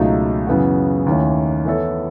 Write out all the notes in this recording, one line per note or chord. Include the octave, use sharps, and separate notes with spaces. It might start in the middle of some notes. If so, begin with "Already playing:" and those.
Already playing: C#2 B2 F#3 A3 D#4
F#2 C#3 E3 B3 F#4
D#2 D#3 A3 C#4 E4
E3 B3 E4 A4 C#5